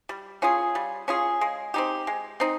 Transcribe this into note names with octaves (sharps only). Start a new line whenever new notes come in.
G3
C#4 F4 G#4
G3
C#4 F4 G#4
G#3
C4 D#4 G4
G#3
C4 D#4